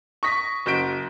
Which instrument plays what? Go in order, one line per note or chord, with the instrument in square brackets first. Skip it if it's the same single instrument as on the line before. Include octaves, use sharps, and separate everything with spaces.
[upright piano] C#6 D#6 A#6 B6
F#1 F#4 G6 B6 D7